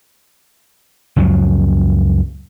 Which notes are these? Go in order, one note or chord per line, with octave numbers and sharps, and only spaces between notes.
C#2 F#2 F3 F#3